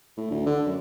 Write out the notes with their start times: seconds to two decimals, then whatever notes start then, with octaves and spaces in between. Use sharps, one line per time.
0.17 A2
0.30 D2
0.46 D3
0.66 F#2